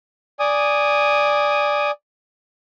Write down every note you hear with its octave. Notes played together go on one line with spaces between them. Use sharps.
D5 G#5 D#6